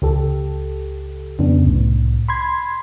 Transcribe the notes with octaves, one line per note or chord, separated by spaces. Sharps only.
C#2 G4 A4
F2 C#3 B3 D4
C2 A2
B5 C6 G#6